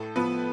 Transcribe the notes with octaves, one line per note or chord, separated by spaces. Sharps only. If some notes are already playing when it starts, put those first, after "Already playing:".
Already playing: A2 A4
F3 B3 B4